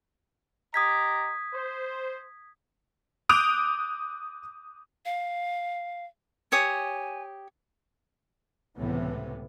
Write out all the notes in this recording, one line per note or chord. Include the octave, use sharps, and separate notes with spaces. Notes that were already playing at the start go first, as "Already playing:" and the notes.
G4 D#5 A#5 D#6 G#6 B6
C5
D6 D#6 F#6 G6 D7 F7
F5
G4 C#5 G#5 D#6
C#2 A2 C3 E3 B3